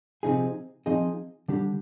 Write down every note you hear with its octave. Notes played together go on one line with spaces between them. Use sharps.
C3 F3 C4 D#4 G#4
F3 C4 D#4 G#4 D#5
D3 G3 D4 G4